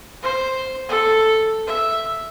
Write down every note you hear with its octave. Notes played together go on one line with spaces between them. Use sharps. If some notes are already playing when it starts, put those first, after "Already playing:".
C5
A4
E5